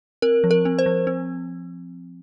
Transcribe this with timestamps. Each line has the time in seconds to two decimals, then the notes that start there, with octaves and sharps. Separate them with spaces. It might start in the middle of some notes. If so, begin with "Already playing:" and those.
0.22 C4 A#4
0.44 F3
0.51 A#4
0.65 C4
0.79 C5
0.86 F3
1.07 C4